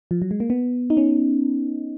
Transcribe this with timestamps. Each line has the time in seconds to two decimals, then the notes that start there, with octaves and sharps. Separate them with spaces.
0.11 F3
0.22 F#3
0.31 G#3
0.40 A#3
0.50 B3
0.90 D#4
0.97 C#4